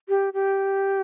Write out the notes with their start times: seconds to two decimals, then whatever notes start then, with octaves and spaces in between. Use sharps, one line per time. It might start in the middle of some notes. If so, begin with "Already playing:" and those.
0.09 G4
0.34 G4